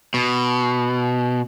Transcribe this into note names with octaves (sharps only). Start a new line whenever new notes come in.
B2